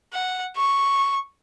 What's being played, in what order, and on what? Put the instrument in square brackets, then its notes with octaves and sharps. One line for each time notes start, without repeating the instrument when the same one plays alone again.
[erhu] F#5
C#6